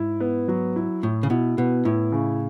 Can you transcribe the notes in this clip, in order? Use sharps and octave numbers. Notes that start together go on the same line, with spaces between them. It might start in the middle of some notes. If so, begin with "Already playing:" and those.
Already playing: G#2 E4
B3
F#3
E4
A2 E4
C#3
B2 E4
B2 B3
A2 E4
C#3